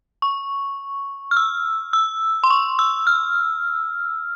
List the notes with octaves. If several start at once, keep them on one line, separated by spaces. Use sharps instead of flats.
C#6
F6
E6
E6
C6
C#6
E6
F6